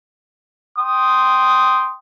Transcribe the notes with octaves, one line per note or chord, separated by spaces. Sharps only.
G5 C6 D#6